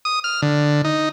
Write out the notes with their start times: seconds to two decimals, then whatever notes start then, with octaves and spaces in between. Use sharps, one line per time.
0.05 D#6
0.24 F6
0.42 D3
0.84 D#4